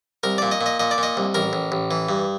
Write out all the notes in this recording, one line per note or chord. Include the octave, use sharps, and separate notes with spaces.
C2 A#4
A#2 D5
D#5
A#2
D#5
A#2 D#5
D5
A#2 D#5
C2
A1 A#4
A1
A1
E3
G2